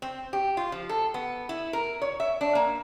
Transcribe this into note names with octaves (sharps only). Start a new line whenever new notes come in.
C4
G4
F4
F3
A4
B3
E4
A#4
C#5
E5
D4
A#3